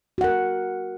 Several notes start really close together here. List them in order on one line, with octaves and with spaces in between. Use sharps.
F#4 F#5 A#4